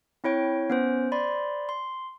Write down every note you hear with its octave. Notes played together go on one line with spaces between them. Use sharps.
C4 E4 C#5 G5
B3 C#4 C5
C5 D5 B5 C6
C6